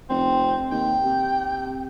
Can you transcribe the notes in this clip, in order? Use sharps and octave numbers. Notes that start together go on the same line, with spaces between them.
F1 C4
D#2 G5
C3